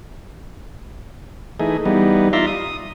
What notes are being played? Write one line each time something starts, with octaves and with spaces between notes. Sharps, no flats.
E3 A3 D#4 G#4
E3 G3 B3 D#4
D#4 F4 D5 E5 A#5 C6
D#6